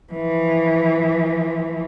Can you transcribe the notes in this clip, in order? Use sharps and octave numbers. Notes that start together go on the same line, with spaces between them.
E3 F3